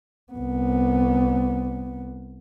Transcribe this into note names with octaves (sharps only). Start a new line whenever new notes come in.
C2 B3